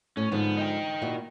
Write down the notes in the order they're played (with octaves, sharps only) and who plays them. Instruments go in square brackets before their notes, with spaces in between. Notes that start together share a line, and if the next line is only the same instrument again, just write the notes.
[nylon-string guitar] A2 [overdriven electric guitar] C#4
[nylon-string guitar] G#2 D3 F3 [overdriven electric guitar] B3
[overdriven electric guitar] D#4 G5
[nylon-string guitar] A#2 E4 F#4